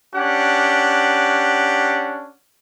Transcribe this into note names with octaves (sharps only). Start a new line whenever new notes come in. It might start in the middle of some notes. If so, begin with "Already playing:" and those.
C#4 D4 G4 F#5